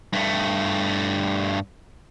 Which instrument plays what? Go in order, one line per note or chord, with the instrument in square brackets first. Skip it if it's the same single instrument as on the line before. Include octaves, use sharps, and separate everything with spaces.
[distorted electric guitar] G2 A3